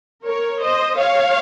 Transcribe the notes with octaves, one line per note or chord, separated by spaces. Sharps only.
A#4 C#5
C5 D#5
C#5 F5